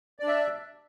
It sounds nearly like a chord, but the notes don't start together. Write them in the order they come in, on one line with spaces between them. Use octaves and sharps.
D5 D4 E5